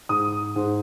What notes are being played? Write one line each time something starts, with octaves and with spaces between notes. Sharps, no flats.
G#2 D#6
G#2